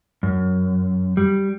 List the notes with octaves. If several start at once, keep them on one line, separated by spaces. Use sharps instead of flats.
F#2
G3